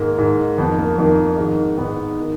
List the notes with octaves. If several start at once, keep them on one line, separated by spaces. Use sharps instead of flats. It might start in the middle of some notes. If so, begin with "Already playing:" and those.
Already playing: G#2 D#3 A#3
G#2 D#3
F2 D#3 B3
A#3
F2 D#3 A#3
G#2 D#3
G#2 D#3 B3
D#3